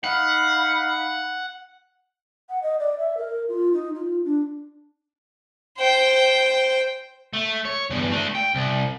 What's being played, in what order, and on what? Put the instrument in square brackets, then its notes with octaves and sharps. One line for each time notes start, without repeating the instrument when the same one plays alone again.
[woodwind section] D#4 F5 [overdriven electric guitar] F#5 [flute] B5
[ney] F#5
D#5
D5
E5
A#4
F4
D#4
F4
D4
[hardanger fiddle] C5 G5
[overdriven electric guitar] A3
C#5
E2 G2
A3 D4
G5
C2